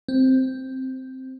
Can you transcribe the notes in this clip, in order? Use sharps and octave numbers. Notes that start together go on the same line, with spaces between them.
C4